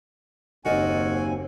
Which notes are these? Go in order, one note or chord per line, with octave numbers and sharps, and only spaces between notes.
F#1 D#2 C4 F#4 A#4 D5 D#5 G#5